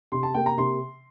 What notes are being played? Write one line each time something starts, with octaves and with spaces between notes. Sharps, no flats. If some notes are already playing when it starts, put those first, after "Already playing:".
C3 C6
A5
A#3 G5
A#5
C3 C6